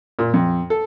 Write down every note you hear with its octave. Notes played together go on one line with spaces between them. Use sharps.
A#2
F2
A4